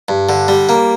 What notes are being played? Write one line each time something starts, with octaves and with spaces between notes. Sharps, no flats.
G2
D3
G3
A#3